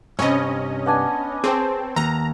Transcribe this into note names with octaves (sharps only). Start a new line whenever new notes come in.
G2 C3 C#4 C#5 D#5 B5 D#6
B3 D4 G#5
C4 G#4 C5 C#5 A5
D#2 A#5